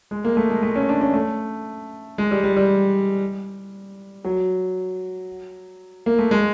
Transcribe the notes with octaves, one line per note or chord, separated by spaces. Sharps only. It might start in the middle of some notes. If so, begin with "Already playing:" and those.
G#3
A#3
A3
G#3
A3
C#4
D4
C#4
A3
G#3
G3
G3
G3
F#3
A#3
A3
G#3